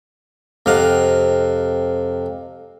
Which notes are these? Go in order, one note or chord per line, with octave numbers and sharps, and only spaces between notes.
F2 C3 D#5 F5 F#5